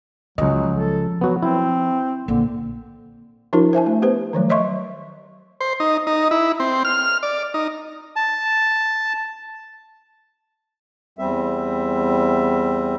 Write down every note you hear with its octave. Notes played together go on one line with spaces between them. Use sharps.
C#2 F3 F#3 D#5
A4
F#3 B3 F#4
C4 E4
A#1 D3 A#3
F3 D4 E4 F#4 A#4
C5 E5 G#5 A5
A3
B3 G4 B4 C5
D#3 F3 F#3 A3
C#5 D#5 E5 C6 C#6
C5
D#4
D#4
E4
C4
F6
D5
D#4
A5
E2 G3 C4 E5